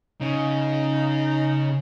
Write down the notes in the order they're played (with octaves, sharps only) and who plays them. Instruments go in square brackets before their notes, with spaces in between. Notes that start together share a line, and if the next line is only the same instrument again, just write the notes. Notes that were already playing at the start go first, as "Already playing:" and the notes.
[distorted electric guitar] C#3 [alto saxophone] D#4